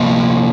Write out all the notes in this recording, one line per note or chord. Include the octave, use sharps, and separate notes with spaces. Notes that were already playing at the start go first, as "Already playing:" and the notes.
Already playing: C3 F3 A#3